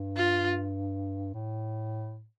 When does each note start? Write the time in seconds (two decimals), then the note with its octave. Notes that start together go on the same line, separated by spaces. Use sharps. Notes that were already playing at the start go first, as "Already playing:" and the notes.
Already playing: G2
0.17 F4
1.34 A2